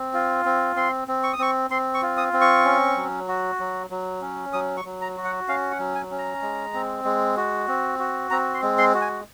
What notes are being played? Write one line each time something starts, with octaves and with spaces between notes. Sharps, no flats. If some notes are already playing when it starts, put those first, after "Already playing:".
Already playing: C4
F4
C4
C4 C6
C4
C#6
D#6
C4 C#6
C4 C6
C#6
F4
D#6
C4
C#6
C#4
F#3
F#4
F#3
F#3
C#4
F#3 D#6
C#6
F#3
A#5
F#4
F#5
C#4 F5
F#5
F#3
G#5
C#4
A#5
G#3
C4
G#3
F#4
C4
F#4
C4 A#5
C6
G#3
C6
F#4
G#5